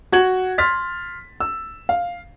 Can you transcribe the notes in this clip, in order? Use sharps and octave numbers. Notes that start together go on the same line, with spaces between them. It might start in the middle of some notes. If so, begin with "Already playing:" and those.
F#4 G#6 F#7
C6 F6 A6 B6
E6
F5